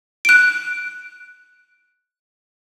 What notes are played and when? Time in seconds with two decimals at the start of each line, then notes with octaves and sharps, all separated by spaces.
0.25 F#6 D7